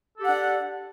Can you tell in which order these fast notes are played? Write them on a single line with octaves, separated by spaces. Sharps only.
A4 G4 F#5 D4